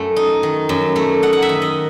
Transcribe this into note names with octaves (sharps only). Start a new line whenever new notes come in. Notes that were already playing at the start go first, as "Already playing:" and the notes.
Already playing: F#2 A3
D#4
D#3
F#2
A3
D#4 F#5
F#5
E5
D#3
D#5